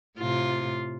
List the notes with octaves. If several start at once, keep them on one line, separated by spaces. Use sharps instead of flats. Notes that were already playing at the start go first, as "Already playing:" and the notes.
A2 C3 F4